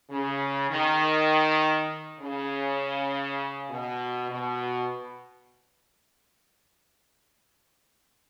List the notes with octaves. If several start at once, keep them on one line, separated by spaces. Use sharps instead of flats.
C#3
D#3
C#3
B2
B2